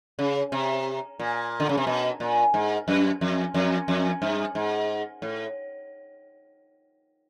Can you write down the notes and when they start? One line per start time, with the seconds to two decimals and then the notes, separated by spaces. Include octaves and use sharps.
0.19 C#3
0.52 C3
1.20 A#2
1.60 D3
1.69 C#3
1.77 C3
1.87 B2
2.20 A#2
2.54 G#2
2.88 F#2
3.21 F2
3.54 F2
3.88 F2
4.22 G2
4.55 G#2
5.22 A2